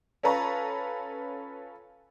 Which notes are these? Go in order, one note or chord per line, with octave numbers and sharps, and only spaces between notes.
C#4 F4 A4 B4 A#5 C#6